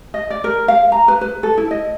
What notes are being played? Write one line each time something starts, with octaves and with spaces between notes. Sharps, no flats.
D#5
D5
A#4
F5
A#5
B4
B4
A4
E4
D#5